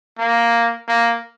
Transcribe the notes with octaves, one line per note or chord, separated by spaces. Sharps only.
A#3
A#3